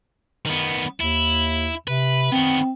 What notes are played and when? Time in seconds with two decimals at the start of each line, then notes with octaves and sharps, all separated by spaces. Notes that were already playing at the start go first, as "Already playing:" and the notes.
0.46 D#3 B3
1.00 D#2 E4
1.88 C3 B4
2.32 D#3 B3 C4